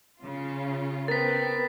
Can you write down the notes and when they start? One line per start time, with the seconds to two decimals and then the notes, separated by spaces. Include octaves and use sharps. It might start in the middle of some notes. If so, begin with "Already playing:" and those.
0.20 C#3 F4
1.08 B3 C4 A#4 A6 B6